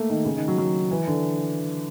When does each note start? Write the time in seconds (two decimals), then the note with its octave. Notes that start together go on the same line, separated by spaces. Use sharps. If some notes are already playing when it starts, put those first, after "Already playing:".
Already playing: A3 A#3
0.10 D#3
0.25 C#3
0.36 D#3
0.48 F#3
0.58 F#3
0.91 E3
1.07 D3